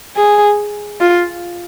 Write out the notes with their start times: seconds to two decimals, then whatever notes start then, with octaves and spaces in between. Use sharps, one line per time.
0.16 G#4
1.00 F4